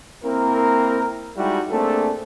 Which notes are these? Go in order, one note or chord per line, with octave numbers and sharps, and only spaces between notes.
A#3 C4 E4 A#4
G3 G#3 D#4 E4 F#4 G4
A3 A#3 C4 D4 G#4 A4